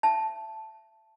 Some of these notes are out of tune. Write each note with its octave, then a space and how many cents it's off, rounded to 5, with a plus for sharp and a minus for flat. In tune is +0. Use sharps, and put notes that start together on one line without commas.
E5 +25 A5 -5